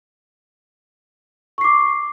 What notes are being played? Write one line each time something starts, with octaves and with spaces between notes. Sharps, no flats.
C#6 D6 C7